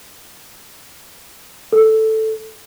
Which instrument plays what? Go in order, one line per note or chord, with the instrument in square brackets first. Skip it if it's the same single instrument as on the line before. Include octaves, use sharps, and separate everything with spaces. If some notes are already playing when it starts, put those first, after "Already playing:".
[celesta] A4